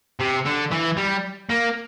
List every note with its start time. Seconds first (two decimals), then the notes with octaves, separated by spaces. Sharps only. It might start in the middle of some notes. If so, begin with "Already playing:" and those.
0.20 C3
0.46 D3
0.72 E3
0.97 G3
1.50 A#3